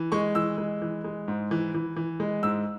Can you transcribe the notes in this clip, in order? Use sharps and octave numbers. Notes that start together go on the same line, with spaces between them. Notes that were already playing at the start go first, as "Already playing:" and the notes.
Already playing: E3
G#3 C#6
E3 E6
G#3
E3
G#3
G#2
E3
E3
E3
G#3
G#2 E6